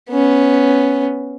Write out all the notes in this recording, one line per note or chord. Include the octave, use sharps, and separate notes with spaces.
B3 C#4